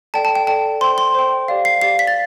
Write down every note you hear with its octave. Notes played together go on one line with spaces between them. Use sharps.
A4 D5 G5 A5
A5
G5
A4 D5 G5 A5
C5 G5 C6
C6
C5 G5
G4 D5 F5
C7
G4 D5 F5 C7
B6
A6